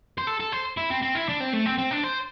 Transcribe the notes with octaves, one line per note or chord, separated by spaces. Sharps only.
C5
A4
A4
C5
E4
C4
C4
E4
D4
C4
A3
C4
C4
D4
C5